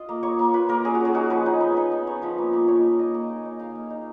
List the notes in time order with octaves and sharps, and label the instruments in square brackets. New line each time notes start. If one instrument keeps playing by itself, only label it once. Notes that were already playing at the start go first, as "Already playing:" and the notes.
Already playing: [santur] F4 D#5
A#3
A#3 C#5
A#3
F4 B4
A#3 A#4
C#4 G#4
F#4
C#4 G#4
D#4 F#4
F3 B4
D#4
B3
D#4
B3
B3 C#5
F3 B4
A#3
A#3
D#4 C#5
A#3
A#3 D#5
A#3
D#4
D#4
D#4 F5
A#3
D#4